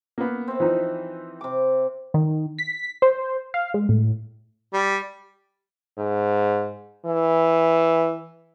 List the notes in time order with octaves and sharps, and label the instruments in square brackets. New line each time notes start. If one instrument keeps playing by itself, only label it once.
[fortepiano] A#3 B3
[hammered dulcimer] C4 E5
[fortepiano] E3 F3 D#4
[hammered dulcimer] C3 D6
[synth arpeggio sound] D#3
B6
C5
F5
G#3
A2
[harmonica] G3
[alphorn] G#2
E3